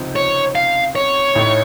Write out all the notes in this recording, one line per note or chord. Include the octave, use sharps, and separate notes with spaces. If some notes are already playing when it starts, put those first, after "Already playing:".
Already playing: C#2 C3 F3 C4 D#4
C#5
F5
C#5
A1 A2 A3 D#4